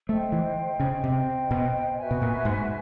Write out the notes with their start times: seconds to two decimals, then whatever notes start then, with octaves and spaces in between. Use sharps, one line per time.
0.09 A3 C5 D#5 G5
0.32 E3
0.80 C#3
1.04 C3 C5 D#5 G5
1.51 B2
1.98 F#4 B4 E5 G#5
2.11 B2
2.22 A#2
2.45 G#2